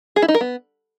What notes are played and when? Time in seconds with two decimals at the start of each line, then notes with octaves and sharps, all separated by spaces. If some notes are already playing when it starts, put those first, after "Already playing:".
0.16 G#4
0.22 E4
0.28 D#4
0.35 A#4
0.41 B3